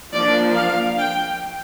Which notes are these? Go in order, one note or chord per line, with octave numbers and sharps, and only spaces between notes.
F3 A#3 D4 D5
F5
G5